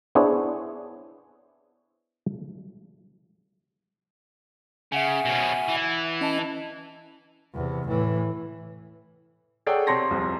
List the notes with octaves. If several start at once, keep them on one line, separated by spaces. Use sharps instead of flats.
B3 D4 E4 G#4 C5 C#5
C#3 E5 F#5 G#5
B2 C#4
E3
C#4 D#5 A5
E2 C3
A2 E3
G#4 A4 C#5 D5 F#5 G5
C3 C4 C#5 A5 C6 A#6
D#1 C2 F2